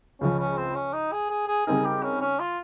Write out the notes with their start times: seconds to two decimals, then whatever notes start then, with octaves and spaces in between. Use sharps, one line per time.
0.21 C#2 C#3 F3 C#4
0.39 C#4
0.57 C4
0.75 C#4
0.93 D#4
1.12 G#4
1.30 G#4
1.48 G#4
1.66 C#3 G3 C4 D#4 G#4 A#4
1.85 G4
2.03 C#4
2.21 C#4
2.39 F4